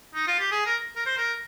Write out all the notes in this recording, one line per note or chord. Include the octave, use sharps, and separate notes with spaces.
D#4
F4
G4
G#4
A#4
A#4
C5
A#4